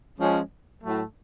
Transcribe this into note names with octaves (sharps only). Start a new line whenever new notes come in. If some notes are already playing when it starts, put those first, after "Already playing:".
F3 G#3 C#4
A2 F#3 A3